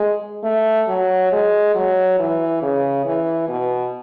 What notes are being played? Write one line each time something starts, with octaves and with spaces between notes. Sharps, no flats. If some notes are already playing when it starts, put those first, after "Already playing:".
Already playing: G#3
A3
F#3
G#3
F#3
E3
C#3
E3
B2